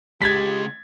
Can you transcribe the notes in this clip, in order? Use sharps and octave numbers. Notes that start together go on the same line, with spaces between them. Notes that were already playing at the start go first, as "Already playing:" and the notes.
C#2 G#3 G4 G#6 A6 B6